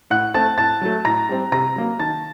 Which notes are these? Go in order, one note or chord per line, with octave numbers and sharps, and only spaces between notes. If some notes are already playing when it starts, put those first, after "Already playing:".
A2 F#5 F#6
A3 C4 A5 A6
A2 A5 A6
F#3 A3
A2 A#5 A#6
G3 C4
C3 A#5 A#6
F#3 A#3
D#3 A5 A6